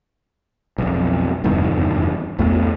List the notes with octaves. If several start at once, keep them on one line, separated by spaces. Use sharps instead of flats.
B1 F2
F1 E2 G2 D#3
A#1 E2 A3